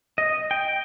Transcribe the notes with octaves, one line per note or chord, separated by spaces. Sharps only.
D#5
G5